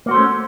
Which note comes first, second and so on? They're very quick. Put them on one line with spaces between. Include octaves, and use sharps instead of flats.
A#3 F#4 C5 A3 C#4